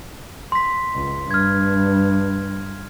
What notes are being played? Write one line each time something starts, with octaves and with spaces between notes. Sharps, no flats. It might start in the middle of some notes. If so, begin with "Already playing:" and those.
C6 B6
C#2
G2 F6 G#6